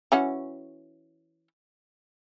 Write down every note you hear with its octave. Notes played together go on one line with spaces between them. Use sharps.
E3 C#4 F#4